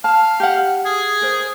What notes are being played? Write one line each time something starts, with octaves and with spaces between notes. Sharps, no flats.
F5 A5
G4 F#5
G#4
A#4 C5